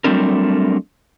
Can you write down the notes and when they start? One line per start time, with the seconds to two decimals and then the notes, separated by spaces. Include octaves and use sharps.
0.04 F#3 G3 A3 C4 D4 A#4